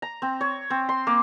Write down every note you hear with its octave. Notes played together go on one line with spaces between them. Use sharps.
A#5
C4
C#5
C4
C6
A#3